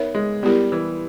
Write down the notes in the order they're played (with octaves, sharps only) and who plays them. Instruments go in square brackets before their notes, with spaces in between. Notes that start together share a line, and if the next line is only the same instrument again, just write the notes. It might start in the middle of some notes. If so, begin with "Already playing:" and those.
Already playing: [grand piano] B3 [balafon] D#4 A#4 C#5 E5
[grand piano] G#3
[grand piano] G3 [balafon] B3 E4 G4 A#4
[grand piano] E3